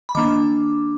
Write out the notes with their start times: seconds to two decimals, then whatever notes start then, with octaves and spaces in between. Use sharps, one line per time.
0.09 B5
0.15 D#3 A#3 D4 D6